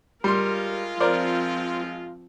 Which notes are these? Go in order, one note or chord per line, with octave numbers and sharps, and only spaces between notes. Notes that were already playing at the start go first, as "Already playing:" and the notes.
G3 G#3 F4 A#4 C6
F3 C4 A#4 C5 D5